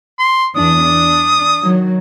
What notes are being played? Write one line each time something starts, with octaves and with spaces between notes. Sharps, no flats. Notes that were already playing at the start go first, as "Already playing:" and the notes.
C6
E2 D4 D#6
D4
D#3 F#3